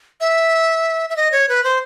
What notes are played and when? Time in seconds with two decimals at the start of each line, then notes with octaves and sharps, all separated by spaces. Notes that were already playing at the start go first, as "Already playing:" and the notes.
0.21 E5
1.10 E5
1.16 D#5
1.32 C#5
1.49 B4
1.64 C5